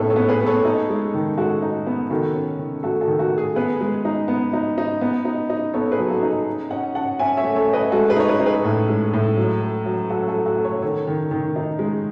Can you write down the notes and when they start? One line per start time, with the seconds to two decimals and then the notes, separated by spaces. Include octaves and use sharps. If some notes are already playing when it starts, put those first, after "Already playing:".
Already playing: A2 B3 D#4 G#4 A4 B4 C#5
0.10 A4 C#5
0.16 B3
0.29 G#4 B4
0.41 B3
0.46 A4 C#5
0.65 D#4
0.90 G#3
1.14 D#3
1.38 G#3 F#4 A4
1.62 D#4
1.87 B3
2.10 D#3 F#4 A4
2.35 C#4
2.59 D#3
2.83 A3 F#4 A4
3.01 F#4 A4
3.08 D#3
3.19 F#4
3.32 A3
3.38 G#4
3.56 B3 G#4 B4
3.81 G#3
4.05 D#4
4.28 B3
4.53 D#4
4.78 D#4
5.01 B3
5.25 D#4
5.50 D#4
5.74 B3 A4 C#5
5.92 G#4 B4
5.98 F#3
6.10 F#4 A4
6.23 D#4
6.29 G#4
6.47 C#4
6.71 C#4 D#5 F#5
6.95 C#4 F#5 A5
7.19 C#4 E5 G#5
7.37 C#5 E5
7.43 A3
7.56 A4 C#5
7.68 A3
7.73 B4 D#5
7.92 G#3 F#4 A4
8.10 G#4 B4
8.16 D#4 C#5
8.28 G#4 B4
8.40 D#4
8.46 G#4 B4
8.64 A2
8.89 G#3
9.14 A2
9.37 F#3
9.61 A3
9.86 F#3
10.09 F#3 F#4 A4
10.28 F#4 A4
10.34 F#3
10.46 F#4 A4
10.59 A3
10.64 A4 C#5
10.82 D#3 A4 C#5
11.07 D#3
11.31 D#3
11.56 D#4
11.79 G#3